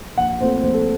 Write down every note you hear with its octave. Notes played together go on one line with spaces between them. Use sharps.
A#1 F#5
A#2 A3 C4 C5
A#1 C5
A4